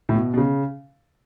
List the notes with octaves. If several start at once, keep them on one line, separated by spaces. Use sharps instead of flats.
A2
B2
B2
C#3